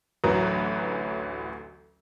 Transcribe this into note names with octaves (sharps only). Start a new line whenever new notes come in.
A1 D2 E3 F#3 B4 A#5